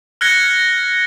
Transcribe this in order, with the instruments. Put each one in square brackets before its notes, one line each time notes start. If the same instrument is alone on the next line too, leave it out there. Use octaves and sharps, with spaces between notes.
[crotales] F6 F#6 G#6 A#6 C#7 G7